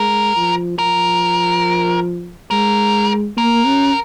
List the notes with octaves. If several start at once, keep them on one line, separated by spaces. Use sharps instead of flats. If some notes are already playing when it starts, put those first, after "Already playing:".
Already playing: G#3 A#4
F3
F3 A#4
G#3 A#4
A#3 A#4
C#4